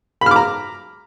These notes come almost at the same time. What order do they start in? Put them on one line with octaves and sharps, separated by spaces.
B5 F6 D6 A#5